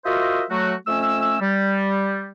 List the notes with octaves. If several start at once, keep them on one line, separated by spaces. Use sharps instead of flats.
F4 F#4 A#4 C5 D#5 E5
F#3 A3 F#4
F2 A3 C#4 E6
G3